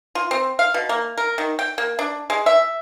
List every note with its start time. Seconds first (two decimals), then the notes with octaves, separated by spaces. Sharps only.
0.15 F4
0.31 C4
0.59 F5
0.74 B2
0.89 A#3
1.17 A#4
1.38 D#3
1.59 G5
1.78 A#3
1.99 D4
2.30 G#3
2.46 E5